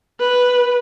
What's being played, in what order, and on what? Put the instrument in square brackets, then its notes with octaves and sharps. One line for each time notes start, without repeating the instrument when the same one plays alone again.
[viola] B4